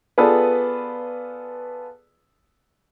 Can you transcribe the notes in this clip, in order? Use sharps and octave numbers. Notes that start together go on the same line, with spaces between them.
B3 F4 G#4 A4 B4 D5